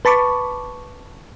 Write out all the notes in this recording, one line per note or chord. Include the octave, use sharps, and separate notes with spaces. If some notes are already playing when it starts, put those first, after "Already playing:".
B4 A5 B5 C#6 D6